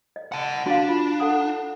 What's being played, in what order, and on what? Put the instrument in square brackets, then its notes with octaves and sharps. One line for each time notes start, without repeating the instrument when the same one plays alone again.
[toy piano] D#5
[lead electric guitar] F#5 A5
[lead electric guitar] D4 [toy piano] F#4 F5
[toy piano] F4
A4 F#5 D#6